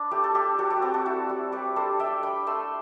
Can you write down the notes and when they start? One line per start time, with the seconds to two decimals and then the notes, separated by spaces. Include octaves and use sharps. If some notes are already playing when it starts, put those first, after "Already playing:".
Already playing: D4 B4
0.11 A3 G4
0.24 A4
0.35 D4 G4
0.58 G3 F#4 A4
0.70 G4 B4
0.76 F#4
0.82 C4 G4
0.94 F#4 A4
1.06 E4
1.29 G3
1.52 G3 G4 B4
1.76 D4 A4 C5
2.00 G3 E5 G5
2.23 D4 G5 B5
2.47 A3 C6 E6